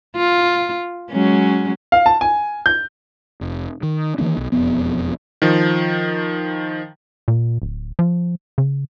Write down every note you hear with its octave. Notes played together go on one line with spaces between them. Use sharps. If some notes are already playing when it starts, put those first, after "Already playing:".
F4
F#3 G#3 C#4
F5
A5
G#5
G6
F1
D#3
D#3 E3 A#3 D4
B1
E1 F2 B3
D#3 F3
A#2
D1
F3
C#3